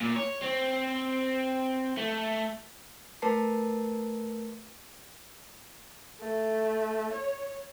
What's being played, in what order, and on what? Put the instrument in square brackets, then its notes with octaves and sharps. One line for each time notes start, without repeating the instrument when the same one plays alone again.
[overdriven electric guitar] A#2
C#5
C4
A3
[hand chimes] A3 A#4 B4 A5 C7
[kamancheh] A3
C#5